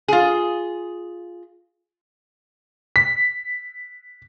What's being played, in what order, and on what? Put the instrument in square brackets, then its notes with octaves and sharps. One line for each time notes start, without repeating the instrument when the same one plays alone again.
[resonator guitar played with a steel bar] F4 G#4
[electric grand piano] B6